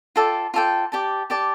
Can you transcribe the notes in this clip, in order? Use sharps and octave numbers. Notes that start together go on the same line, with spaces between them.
F4 A4 D5 G5
F4 A4 D5 G5
G4 D5 A5
G4 D5 A5